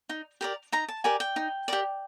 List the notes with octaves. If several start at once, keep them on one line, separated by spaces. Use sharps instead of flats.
D#4
G4 A#4 D5
D#4 A#5
A5
G4 A#4 D5 G#5
G5
D#4
G4 A#4 D5